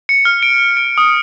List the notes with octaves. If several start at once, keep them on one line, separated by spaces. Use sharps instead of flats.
C#7
F6
D7
D7
D#6